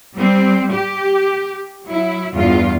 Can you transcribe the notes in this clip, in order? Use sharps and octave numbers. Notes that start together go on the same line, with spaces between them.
G3 C4
G4
F#3 E4
E2 G2 F4